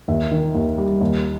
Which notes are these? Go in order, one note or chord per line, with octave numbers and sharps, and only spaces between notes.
D#2 E5
D#3
D#2
G3
D#2